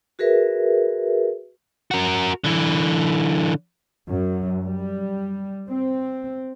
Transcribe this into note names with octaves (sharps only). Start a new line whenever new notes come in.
F#4 G#4 A#4 B4 E5
F#4 A#4
D3 E3
F#2
G3
C4